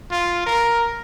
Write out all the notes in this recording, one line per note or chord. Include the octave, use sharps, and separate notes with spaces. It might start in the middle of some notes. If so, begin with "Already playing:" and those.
F4
A#4